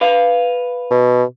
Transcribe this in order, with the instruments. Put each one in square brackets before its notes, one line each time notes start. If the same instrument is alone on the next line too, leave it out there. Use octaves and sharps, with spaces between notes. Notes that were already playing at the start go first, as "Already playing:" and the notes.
[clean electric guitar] B4 F5
[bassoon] B2